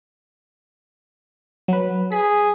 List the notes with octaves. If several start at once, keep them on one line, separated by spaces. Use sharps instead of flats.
F#3 B4
G#4 B6